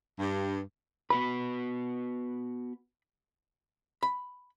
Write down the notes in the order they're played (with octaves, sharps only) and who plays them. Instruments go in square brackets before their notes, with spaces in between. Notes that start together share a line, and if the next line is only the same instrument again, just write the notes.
[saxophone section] G2
[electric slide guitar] B3 F#4 B4 [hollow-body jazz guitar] B5
[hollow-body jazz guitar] B5